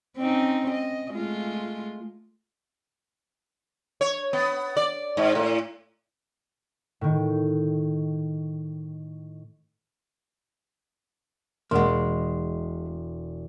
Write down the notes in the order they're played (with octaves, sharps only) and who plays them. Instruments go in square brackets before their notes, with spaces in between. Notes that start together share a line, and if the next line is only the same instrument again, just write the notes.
[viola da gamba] C4 C#4 D#4
D#5
G#3 A3 F4
[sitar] C#5
B3
D5
G#2
A2
[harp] A2 D#3
[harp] E1 D#6 [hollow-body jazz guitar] G#3 A#3 [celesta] F#5 C6